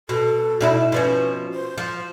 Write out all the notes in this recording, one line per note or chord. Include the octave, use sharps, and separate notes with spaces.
B2 A4
B2 D#4 E4
B2 F3 C#4 B4
C5
F3